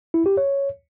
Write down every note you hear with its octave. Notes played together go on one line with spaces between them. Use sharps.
E4
G4
C#5